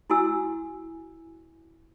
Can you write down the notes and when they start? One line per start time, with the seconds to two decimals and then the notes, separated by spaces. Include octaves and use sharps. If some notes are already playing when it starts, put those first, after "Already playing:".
0.10 E4 F#4 G#5 E6